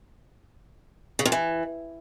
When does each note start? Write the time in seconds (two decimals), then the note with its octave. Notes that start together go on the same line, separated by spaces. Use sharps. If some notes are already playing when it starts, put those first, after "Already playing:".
1.19 C#3
1.25 F2
1.32 E3